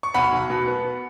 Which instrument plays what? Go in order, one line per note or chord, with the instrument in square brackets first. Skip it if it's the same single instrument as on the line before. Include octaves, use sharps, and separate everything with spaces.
[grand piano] C#6
B1 F#5 B5
B1
B2
B3